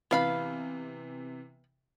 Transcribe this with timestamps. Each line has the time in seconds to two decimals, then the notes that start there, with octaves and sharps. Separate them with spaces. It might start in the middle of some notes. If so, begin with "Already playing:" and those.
0.11 C3 E3 B3 F5 B5